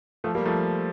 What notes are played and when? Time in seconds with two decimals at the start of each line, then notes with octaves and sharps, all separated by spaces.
0.24 F3 A3
0.35 G3 A#3
0.45 F3 A3